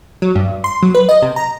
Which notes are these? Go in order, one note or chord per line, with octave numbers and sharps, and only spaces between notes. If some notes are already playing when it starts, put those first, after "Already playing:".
F#3
G2
C6
F#3
B4
D#5
C3
A#5